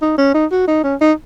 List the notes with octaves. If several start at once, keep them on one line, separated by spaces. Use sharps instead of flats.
D#4
C#4
D#4
F#4
D#4
C#4
D#4